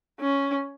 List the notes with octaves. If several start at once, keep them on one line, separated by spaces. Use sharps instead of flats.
C#4